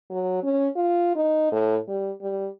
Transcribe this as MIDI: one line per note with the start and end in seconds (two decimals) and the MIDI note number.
0.10 0.40 54
0.43 0.68 61
0.76 1.12 65
1.15 1.49 63
1.52 1.77 45
1.88 2.12 55
2.22 2.48 55